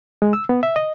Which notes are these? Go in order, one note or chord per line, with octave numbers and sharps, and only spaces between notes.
G#3
E6
B3
E5
D#5